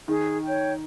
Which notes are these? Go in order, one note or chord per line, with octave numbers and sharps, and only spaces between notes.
D#3 G#4
C#5 G5